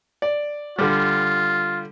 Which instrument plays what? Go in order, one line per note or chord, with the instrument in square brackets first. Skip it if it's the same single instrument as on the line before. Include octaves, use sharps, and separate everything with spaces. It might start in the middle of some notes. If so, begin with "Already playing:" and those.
[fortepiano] D5
[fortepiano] D3 G3 [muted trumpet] F4